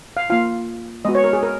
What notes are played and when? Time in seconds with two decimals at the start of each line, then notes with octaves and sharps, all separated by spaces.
0.17 F5
0.30 A#3 F4 F5
1.05 G#3 B3 F#4 D#5
1.15 C#5
1.24 A#4
1.33 G#4
1.43 A#4